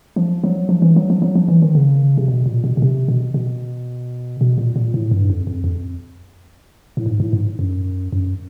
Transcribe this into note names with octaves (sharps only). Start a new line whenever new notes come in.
F3
F#3
F3
E3
F#3
F3
F#3
F3
E3
D#3
C#3
C3
B2
A#2
B2
B2
C3
B2
B2
B2
A#2
A#2
A2
G2
F2
F2
F2
A2
G#2
A2
G#2
F#2
F#2